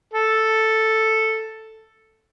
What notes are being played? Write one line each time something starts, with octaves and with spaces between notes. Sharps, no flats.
A4